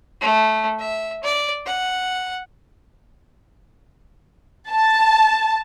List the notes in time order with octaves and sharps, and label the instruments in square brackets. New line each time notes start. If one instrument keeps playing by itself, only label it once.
[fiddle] A3
E5
D5
F#5
[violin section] A5